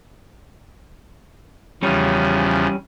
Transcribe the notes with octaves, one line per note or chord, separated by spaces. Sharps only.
E2 C#3 F3 G3 C#4